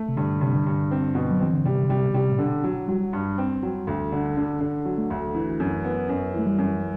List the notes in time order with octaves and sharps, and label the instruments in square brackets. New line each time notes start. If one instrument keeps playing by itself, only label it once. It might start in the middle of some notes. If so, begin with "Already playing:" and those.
Already playing: [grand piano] A3
[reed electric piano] C3
[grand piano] G2 [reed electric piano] D3
[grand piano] G2 [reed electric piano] C3
[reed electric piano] D3
[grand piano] G2
C4
B2
[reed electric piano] F#3
[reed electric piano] E3 [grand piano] C4
[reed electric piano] D3
[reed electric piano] C3 [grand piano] G3
[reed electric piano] D3
[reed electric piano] C3 [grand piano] G3
[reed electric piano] B2
[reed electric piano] C3 [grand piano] G3
[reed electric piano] A2
[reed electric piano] B2 [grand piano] D3
[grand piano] F#3
[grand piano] F#3 [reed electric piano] G3
[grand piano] G2
C4
F#3
D2
D3
D3
D3
F#3
[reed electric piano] A3
[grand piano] D2
E3
F#2
B3
F#2
[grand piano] E3 [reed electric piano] A3
[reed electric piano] G3
[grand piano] F#2